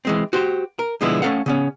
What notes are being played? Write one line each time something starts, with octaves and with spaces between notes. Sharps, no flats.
E3 G#3 C4
F#4 G4 C5
A#4
B1 D3 F3 G#3 B3 E4
A3 C#4 D4 A4 F5 F#5
C#3 B3 C#4